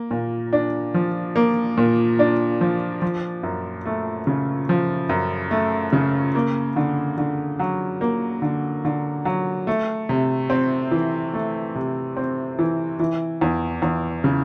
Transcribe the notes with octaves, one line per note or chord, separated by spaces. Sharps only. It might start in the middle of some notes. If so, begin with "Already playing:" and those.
Already playing: A#3
A#2
D4
F3
A#3
A#2
D4
F3
F3
F#2
A3
C#3
F3
F#2
A3
C#3
A#3
D3
D3
F#3
A#3
D3
D3
F#3
A3
C3
C4
E3
A3
C3
C4
E3
E3
E2
E2
C#3